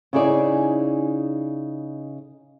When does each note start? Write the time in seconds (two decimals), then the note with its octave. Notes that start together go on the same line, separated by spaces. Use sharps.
0.13 C#3 D#4 E4 G#4 D5